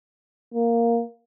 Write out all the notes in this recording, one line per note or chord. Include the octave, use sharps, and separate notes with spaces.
A#3